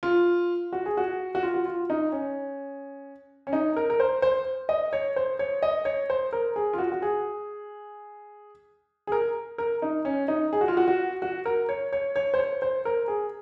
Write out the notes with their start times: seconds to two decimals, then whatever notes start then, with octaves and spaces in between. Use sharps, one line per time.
0.03 F4
0.73 F#4
0.86 G#4
0.97 F#4
1.35 F#4
1.43 F4
1.54 F#4
1.65 F4
1.90 D#4
2.12 C#4
3.47 C#4
3.53 D#4
3.77 A#4
3.90 A#4
4.00 C5
4.22 C5
4.69 D#5
4.93 C#5
5.16 C5
5.39 C#5
5.63 D#5
5.85 C#5
6.10 C5
6.33 A#4
6.56 G#4
6.73 F4
6.78 F#4
6.92 F#4
7.02 G#4
9.07 G#4
9.12 A#4
9.58 A#4
9.82 D#4
10.05 C#4
10.28 D#4
10.53 G#4
10.61 F#4
10.68 F4
10.77 F#4
10.88 F#4
11.22 F#4
11.45 A#4
11.69 C#5
11.93 C#5
12.16 C#5
12.34 C5
12.39 C#5
12.62 C5
12.85 A#4
13.08 G#4